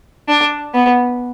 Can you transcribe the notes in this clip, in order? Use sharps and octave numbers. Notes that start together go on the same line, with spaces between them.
D4
B3